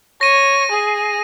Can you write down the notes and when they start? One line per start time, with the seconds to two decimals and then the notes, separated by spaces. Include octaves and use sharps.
0.21 C#5 A#6 D#7
0.71 G#4